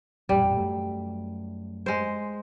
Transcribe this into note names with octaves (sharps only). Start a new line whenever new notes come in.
A1 F2 A#2 G3
F#2 F#3 A3
G#3 C5